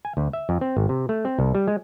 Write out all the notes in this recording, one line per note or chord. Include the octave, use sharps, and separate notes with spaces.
G#5
D2
E5
F2
C4
G#1
C3
A3
C4
C2
G3
G#3